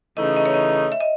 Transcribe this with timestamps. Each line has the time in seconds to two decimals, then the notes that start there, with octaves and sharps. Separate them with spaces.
0.17 C#3 E3 A3 D#4 D#5
0.37 D#5
0.46 C#5
0.54 D#5
0.92 E5
1.01 D#5